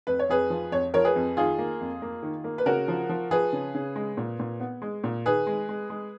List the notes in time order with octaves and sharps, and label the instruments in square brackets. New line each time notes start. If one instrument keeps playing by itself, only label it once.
[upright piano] F2 B4
C#5
F2 G#4 B4
F3
F2 C#5
F3 A#4 C#5
G#4 B4
F2
D#3 F4 G#4
A#3
F2
A#3
D#3
A#3
B4
C#3 F#4 A#4
F3
F3
F3 G#4 B4
C#3
C#3
G#3
A#2
A#2
B3
G#3
A#2
D#3 G#4 B4
G#3
G#3
G#3